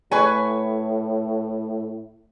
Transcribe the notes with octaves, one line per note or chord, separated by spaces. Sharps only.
A2 B4 C#5 G#5